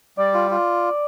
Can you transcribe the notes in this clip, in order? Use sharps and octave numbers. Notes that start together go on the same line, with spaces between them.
G3 D5
F4
F4